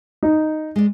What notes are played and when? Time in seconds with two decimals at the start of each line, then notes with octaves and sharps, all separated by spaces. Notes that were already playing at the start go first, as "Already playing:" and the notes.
0.23 D#4
0.76 G#3 D5